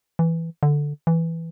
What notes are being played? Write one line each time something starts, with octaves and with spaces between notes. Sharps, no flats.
E3
D3
E3